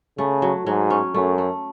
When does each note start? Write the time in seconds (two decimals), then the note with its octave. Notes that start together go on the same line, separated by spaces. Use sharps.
0.18 C#3 A3
0.42 F#3
0.66 G#2 F#3
0.90 C#4
1.14 F#2 A3
1.38 A3